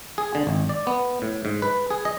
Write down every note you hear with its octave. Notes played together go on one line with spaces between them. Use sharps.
G#4
D3
G#1
D5
B3
A2
G#2
B4
G#4
D#5